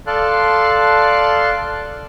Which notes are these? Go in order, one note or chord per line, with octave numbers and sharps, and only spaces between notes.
A4 D5 F5 A5 C6 F#6